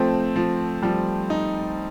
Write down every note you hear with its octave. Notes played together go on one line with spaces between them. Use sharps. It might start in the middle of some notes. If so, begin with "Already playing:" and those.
Already playing: F3 A3 C4
F3
F3 G3
D#4